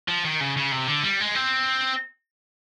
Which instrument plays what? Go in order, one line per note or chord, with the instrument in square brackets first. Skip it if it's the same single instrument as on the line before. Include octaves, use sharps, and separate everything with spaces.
[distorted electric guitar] F3
D#3
C#3
C#3
C3
D3
G3
G#3
C4